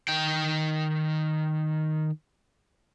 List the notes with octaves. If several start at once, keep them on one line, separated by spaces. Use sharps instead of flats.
D#3 G5